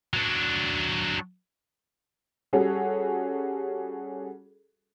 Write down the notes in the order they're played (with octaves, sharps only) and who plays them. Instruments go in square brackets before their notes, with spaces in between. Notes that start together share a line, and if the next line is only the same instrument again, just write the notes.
[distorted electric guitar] F#3 D4
[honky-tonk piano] G3 C#4 F#4 G#4 A4